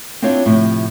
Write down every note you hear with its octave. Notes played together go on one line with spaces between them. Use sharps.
C4 D4 E4 F4 C#5
A2 C3 F3